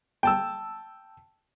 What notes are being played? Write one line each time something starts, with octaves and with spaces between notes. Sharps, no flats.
G5 A5 E6